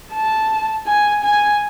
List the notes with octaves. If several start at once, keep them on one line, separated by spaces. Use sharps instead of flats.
A5
G#5
G#5